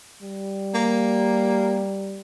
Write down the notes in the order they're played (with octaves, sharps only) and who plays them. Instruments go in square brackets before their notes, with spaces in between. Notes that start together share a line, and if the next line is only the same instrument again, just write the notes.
[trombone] G3
[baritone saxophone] A#3